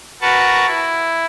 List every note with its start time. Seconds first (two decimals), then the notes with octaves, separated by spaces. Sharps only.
0.22 F#4 A#4 B4 F#5 A5 C#6
0.66 E4